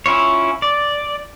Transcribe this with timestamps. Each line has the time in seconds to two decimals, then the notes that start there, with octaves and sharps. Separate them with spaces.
0.06 C#4 E4 F4 C#5
0.62 D5